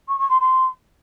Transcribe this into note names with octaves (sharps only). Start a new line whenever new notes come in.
C#6
C#6
C6
C6